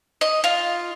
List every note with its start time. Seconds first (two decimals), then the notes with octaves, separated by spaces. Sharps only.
0.21 D#5
0.44 F4